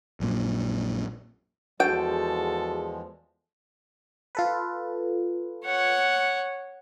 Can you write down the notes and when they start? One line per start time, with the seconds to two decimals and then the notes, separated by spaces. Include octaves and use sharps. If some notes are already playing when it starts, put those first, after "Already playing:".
0.20 A#1 F#2 A#2
1.80 E2 F3 G#3 F#4 A4 G5
4.35 F4 A4 B4
5.65 C#5 F#5